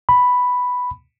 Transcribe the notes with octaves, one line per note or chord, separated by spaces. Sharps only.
B5